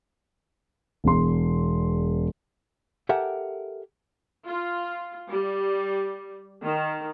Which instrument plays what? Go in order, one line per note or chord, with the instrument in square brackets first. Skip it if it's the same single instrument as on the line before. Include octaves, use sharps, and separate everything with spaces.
[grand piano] E1 E2 C6
[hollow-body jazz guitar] G4 A4 A#4 E5 F#5 G#5
[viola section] F4
G3
D#3